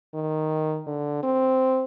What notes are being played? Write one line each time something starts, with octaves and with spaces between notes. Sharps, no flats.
D#3
D3
C4